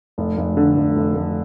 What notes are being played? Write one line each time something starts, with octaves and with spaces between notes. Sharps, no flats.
F1
F1
D3
F1
F1
F1